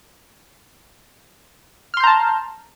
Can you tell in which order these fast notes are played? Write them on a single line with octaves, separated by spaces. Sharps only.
F6 C6 G6 A#5 A5